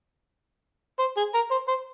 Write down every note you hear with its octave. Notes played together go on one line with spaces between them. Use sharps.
C5
G#4
A#4
C5
C5